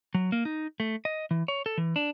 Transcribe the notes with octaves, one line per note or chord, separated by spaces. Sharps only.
F#3
A#3
D#4
A3
D#5
E3
C#5
A4
E3
D4